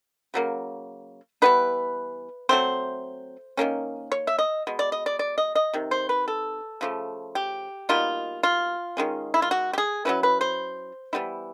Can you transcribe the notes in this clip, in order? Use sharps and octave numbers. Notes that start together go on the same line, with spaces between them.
C#3 F#3 A#3
E3 G3 B3 D#4 B4
F#3 A3 C4 C5
D#3 F#3 A#3 C#4
C#5
E5
D#5
B2 G#3
D5
D#5
D5
D5
D#5
D#5
C3 D#3
C5
B4
A4
C#3 F3 A3
G4
B2 G3 A#3 D#4 F4
F4
D#3 G#3 C#4
E4
F4
F#4
G4
G#4
F#3 A#3 C#4 E4 B4
B4
C5
E3 G3 B3 E4